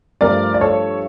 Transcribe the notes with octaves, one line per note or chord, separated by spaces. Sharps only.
G2 F3 A3 A#4 D5
D5
A4 C#5